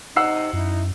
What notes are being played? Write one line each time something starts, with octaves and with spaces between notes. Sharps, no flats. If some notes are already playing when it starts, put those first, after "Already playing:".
C3 D#4 F#5 E6 C7
F#2 D#4 E4